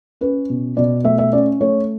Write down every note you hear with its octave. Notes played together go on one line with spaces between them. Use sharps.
C#4 B4
B2
B2 D5
A3 E5
E5
C#4 D5
A3 C#5